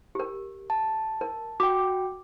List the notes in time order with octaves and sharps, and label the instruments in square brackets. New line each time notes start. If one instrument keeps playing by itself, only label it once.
[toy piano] G4 A#4
[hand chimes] A5
[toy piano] A#4
[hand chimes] F#4 G5 [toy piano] D6